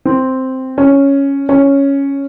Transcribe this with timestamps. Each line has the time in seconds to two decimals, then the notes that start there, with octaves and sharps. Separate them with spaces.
0.05 C4
0.78 C#4
1.49 C#4